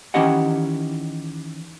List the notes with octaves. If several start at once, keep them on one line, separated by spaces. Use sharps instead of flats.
D#3 E3 C#4 G4 D#5 F#5